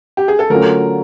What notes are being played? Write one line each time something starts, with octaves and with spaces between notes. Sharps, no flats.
G4
G#4
A4
D3 F#3 A3 C#4 F4 A#4